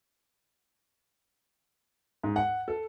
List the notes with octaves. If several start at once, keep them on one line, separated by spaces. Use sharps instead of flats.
G#2
F#5
A4